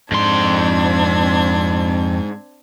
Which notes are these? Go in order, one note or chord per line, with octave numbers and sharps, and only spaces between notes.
F2 G#2 C4 D4 C6 G#6